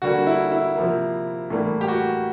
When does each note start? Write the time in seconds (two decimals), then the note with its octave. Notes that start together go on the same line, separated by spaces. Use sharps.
0.02 D3 G3 A#3 F#4
0.27 E4
0.52 E4
0.76 C3 F3 A#3
1.50 A2 E3 G3 A#3
1.81 G4
1.88 F#4